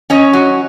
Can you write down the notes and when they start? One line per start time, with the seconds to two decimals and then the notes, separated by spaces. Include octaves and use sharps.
0.10 C#4 C#5 D#5
0.33 F#3